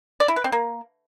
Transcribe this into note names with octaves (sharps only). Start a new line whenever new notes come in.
D5
E4
B4
C4
A#3